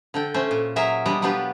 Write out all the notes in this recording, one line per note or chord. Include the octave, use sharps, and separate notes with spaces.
D3 A4 G5
A3 C#4 C5
A#2
F#3 G#4 A#4 E5 A#5
B2 G3 G#3 D4 D#5
F#3 B3 D4 F4 G4 B4